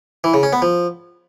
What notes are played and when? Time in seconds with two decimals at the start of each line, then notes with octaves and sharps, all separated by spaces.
0.24 E3
0.34 C#3
0.43 C#4
0.53 B3
0.62 F3